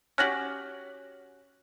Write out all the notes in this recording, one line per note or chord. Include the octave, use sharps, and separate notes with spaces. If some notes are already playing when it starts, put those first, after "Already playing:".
C#4 F#4 G4 F#6 A#6 F#7